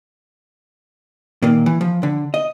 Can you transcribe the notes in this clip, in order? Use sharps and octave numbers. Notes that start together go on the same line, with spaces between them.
A#2 D#3 A#3
E3
F3
D3
D#5